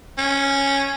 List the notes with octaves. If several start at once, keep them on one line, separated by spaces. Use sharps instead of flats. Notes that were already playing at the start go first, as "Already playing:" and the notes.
C#4